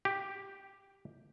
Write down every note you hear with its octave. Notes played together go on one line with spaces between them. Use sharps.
G4